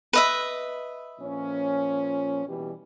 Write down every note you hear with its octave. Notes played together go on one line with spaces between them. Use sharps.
B4 D#5 E5
A#2 F3 C#4
B2 E3 G3